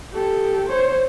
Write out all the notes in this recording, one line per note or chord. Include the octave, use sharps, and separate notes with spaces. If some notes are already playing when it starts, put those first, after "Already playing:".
G4 A4
C5 C#5